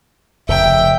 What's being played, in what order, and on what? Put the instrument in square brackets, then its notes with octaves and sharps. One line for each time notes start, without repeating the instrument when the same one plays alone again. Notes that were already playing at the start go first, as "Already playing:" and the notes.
[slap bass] F1 C#3 [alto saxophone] E5 [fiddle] G5